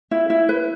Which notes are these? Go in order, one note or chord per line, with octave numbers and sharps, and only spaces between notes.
E4
E4
B4